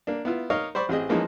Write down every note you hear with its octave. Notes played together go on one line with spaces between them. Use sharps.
A#3 D4
B3 E4 F4
D#4 A#4 C#5 D#5 F5
C5 D5 B5 C#6
A1 C4 G#4 D#5
E3 F3 G#3 A#3 C#4 D#4